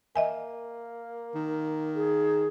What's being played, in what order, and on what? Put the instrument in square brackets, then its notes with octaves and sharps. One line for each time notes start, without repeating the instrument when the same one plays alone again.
[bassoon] A#3 [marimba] D#5 E5 G#5
[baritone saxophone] D#3
[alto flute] G#4